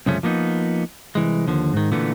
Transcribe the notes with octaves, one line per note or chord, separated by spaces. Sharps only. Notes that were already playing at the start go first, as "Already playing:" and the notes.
C2 F#2 C#3 F3 A3 C#4
F3 A#3 B3 D#4
C2 E3 G#3
D#2 D3 F3
G#2 D#3
A#2 D3 E3 A3 B3